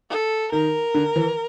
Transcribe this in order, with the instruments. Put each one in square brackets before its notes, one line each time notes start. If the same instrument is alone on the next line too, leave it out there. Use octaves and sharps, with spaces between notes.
[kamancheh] A4
[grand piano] D#3 [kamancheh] A#4
[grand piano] D3
E3